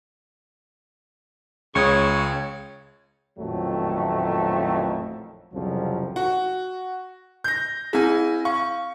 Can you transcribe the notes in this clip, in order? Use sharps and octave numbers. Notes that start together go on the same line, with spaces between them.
C#2 C#3 C#5 C#6 D#6
A1 F2 A#2 D#3 F#3 A3
C2 F2 C#3 F3 F#3
F#4
G6 A#6
C4 E4 G#4 G#5
F5 C#6